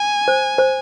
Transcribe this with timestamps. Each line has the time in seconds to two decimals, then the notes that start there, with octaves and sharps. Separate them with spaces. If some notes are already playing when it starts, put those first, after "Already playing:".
Already playing: G#5
0.28 C5
0.58 C5